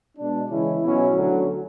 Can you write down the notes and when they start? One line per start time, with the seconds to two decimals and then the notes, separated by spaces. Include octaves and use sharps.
0.17 B2 G#3 D4
0.50 C#3 E3 G#3 C#4 E4
0.81 B2 F#3 C#4 E4
1.13 D2 D3 F#3